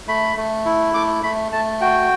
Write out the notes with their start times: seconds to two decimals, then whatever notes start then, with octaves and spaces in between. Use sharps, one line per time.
0.08 A3 B5
0.37 A3
0.65 E4
0.94 A3 D6
1.23 A3 B5
1.52 A3 A5
1.81 F#4 G5